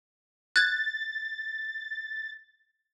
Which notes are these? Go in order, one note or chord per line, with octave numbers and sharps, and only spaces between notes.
F#6 G#6 A6